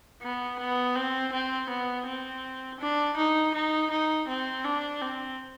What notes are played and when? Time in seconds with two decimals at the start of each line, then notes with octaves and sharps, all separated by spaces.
0.22 B3
0.59 B3
0.96 C4
1.33 C4
1.70 B3
2.06 C4
2.80 D4
3.17 D#4
3.54 D#4
3.91 D#4
4.28 C4
4.65 D4
5.01 C4